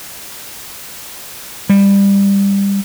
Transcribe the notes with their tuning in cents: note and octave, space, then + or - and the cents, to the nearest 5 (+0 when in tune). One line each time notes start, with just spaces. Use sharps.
G3 +20